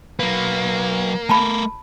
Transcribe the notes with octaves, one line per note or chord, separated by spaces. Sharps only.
F#3 A#3 B4
A3 A#4 A5 B5